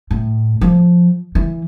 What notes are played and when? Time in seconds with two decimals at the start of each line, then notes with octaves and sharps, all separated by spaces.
0.11 A2
0.61 F3
1.35 E3